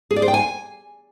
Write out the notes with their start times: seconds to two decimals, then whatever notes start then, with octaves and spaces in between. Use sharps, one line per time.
0.11 G#4
0.16 D5
0.22 C5
0.28 G5
0.34 G#5